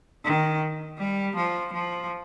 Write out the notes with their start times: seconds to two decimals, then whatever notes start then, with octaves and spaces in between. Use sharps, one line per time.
0.24 D#3
0.98 G3
1.36 F3
1.73 F3